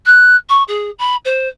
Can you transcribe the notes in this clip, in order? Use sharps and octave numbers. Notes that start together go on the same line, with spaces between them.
F#6
C#6
G#4
B5
C5